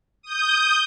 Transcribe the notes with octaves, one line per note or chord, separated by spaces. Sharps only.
D#6 G6